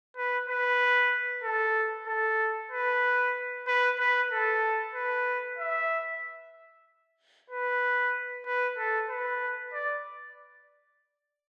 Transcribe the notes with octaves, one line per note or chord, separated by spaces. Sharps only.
B4
B4
A4
A4
B4
B4
B4
A4
B4
E5
B4
B4
A4
B4
D5